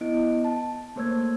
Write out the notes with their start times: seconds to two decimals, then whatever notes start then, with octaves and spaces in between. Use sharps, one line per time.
0.01 B3 E4 D#5 D7
0.44 A5
0.96 A3 A#3 C5 C#5 E6 G#6